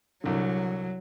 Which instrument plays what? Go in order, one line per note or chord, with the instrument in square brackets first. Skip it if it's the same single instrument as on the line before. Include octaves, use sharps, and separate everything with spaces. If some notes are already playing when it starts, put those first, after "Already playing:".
[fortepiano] C2 D3 [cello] F#3